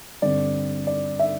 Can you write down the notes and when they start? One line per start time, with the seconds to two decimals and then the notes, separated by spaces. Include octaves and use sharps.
0.22 G2 D3 C4 D5
0.87 D5
1.19 E5